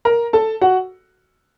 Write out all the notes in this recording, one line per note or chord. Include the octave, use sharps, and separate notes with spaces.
A#4 A#5
A4 A5
F#4 F#5